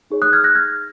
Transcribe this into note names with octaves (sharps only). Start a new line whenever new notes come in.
D#4 G#4 C#5
D#6 F#6
F6 G#6
F#6 A#6
F6 G#6